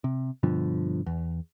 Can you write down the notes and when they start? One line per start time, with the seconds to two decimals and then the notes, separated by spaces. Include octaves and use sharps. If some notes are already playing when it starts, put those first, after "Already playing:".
0.04 C3
0.43 G2 B2 D3 F3
1.06 E2